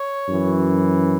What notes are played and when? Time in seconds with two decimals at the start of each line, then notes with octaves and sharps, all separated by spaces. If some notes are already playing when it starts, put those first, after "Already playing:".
Already playing: C#5
0.28 F#2 E3